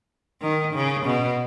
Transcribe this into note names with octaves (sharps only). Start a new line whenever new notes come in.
D#3
C#3
B2